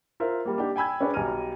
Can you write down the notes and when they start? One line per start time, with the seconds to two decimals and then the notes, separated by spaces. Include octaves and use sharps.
0.20 F4 A#4 C5 E5
0.45 G3 A#3
0.58 D4 D#4 G4
0.76 G5 G#5 B5 E6 G#6
1.01 C#4 D4 G#4 B4 D5
1.14 B1 G3 G#5 A#5 F6 D#7